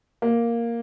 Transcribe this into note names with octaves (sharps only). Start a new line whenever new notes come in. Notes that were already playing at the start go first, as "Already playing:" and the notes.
A#3